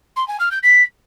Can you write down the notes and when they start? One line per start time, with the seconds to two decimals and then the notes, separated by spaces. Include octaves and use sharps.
0.16 C6
0.28 G#5
0.39 F6
0.51 G6
0.63 B6